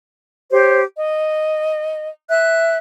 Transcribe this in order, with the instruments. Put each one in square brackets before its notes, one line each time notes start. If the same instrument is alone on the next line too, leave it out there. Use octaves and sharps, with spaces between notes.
[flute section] G4 C5 C#5
D#5
E5 F#6